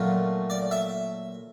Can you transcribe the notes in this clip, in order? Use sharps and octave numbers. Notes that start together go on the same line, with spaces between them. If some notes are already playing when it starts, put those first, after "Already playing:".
Already playing: A#2 F#3 A3 C#4 F4
D5
E5